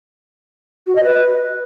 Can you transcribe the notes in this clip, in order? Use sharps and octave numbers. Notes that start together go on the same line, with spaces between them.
F#4
D#5
B4